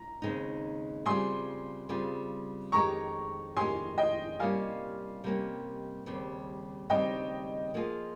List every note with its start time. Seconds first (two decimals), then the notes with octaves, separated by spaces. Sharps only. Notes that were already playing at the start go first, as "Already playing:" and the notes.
Already playing: A#5
0.22 D#2 C#3 G#3 C4 D#4
1.06 C#3 G3 C4 F4 G#4 G#5 C6
1.89 C#3 G3 C4 F4 G#4
2.72 F2 D#3 G#3 C#4 G4 A#5 C#6
3.57 F2 D#3 G#3 C#4 G4 G#5 C6
3.98 D#5 G5
4.40 C3 G3 A#3 C#4 F5 G#5
5.24 C3 G3 A#3 C#4
6.06 D#2 C#3 G3 C4
6.90 D#2 C#3 G3 C4 D#5 G5
7.74 F3 A#3 F4 G#4